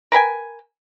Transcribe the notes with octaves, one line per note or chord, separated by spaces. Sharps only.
A#4 B4 G5 G#5